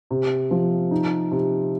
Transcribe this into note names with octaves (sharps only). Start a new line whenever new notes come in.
C3
F3
D#4
C3